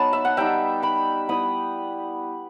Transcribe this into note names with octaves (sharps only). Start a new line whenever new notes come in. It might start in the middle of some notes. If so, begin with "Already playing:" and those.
Already playing: F#3 B3 D#4 A5 B5
E5
F#5
G3 D#4 E5 G5
G5 B5
G3 B3 E4 B5 D#6